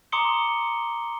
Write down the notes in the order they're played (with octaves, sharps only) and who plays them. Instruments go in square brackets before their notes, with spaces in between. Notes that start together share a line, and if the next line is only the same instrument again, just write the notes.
[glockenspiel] A#5 C6 D6 D#6 C#7 G7